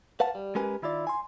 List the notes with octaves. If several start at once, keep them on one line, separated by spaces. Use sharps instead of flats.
B4 F5 F#5 A5
G3
G#3 C#4 G4 A#4 B4 G#5
D#3 E4 F4 D5
G#5 C6